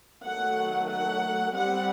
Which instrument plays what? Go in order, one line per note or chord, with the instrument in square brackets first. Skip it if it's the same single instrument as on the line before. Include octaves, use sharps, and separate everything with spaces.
[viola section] D#3 F#3 A3 F#5
F#5
G3 C4 F#5